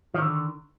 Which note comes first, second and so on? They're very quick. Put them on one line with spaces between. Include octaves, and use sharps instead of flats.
F3 D#3 D3